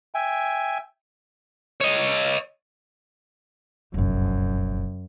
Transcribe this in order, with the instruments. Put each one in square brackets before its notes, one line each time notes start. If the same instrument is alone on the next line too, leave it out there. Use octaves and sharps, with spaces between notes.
[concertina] E5 G5 G#5
[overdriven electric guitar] C#5 D#5
[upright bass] F1 A#1 [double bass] F#2